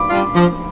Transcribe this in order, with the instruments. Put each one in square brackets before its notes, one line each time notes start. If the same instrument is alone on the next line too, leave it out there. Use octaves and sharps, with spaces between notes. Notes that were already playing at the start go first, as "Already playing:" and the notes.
Already playing: [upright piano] B5 D6
[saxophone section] G3 D4 F4
F3